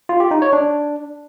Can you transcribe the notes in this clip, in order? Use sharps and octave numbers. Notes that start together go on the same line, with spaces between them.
F4
G4
D#4
C#5
D4